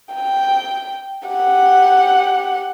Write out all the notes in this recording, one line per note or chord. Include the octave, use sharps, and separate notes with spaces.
G5
G4 F#5